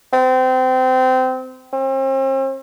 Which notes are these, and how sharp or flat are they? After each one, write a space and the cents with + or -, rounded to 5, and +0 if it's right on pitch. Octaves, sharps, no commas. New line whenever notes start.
C4 -25
C4 +40